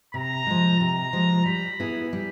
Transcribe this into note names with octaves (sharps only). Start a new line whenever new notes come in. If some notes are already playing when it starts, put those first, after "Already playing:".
C3 A#5
F3 G#3
C3 A#5
F3 G#3
G3 B5
B3 E4 G#4
G3